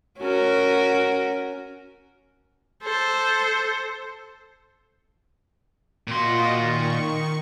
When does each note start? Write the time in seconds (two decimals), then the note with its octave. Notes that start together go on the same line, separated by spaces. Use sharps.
0.20 C#4 F#4 A#4
2.83 A4 C5
6.08 A#2 F4 F#4 D#5 C6
6.54 D#3 C#6